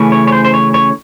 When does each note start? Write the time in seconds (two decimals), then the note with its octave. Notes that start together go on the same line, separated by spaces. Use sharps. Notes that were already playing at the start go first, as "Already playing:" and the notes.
Already playing: C#3 E3 A3 C#4
0.12 C#5
0.27 C#5
0.32 C5
0.45 C5
0.54 C#5
0.74 C#5